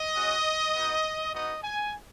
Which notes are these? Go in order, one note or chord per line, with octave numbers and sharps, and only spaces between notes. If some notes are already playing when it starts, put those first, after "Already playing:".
Already playing: D#5
G#3 C#4 F#4
B3 D#4 F#4
B3 D#4 F#4 D#5
G#5